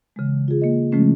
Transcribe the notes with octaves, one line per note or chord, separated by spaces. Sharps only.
C#3 E3 G#3
F4 G#4
A#3 D#5
C#3 F3 G#3 A3 C#4